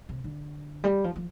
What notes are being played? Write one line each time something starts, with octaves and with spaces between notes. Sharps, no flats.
C3
D3
G3
F3
F3